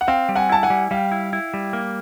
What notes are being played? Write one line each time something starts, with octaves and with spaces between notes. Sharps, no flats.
F#5
C4 F5 G5
G3
F#5 G#5
E4 A5
F#5 G#5
G3
G3 F5 G5
E4
E4
G3
A#3